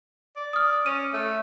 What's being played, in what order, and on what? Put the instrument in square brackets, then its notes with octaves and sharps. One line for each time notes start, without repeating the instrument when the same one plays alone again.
[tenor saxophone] D5
[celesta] D#6 F6
[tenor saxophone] C#4 [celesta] D#7
[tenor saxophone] A3